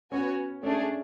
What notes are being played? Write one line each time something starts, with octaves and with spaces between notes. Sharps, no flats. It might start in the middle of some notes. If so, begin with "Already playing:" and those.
B3 C#4 F#4 C#5 G#5
A3 C#4 D4 G#4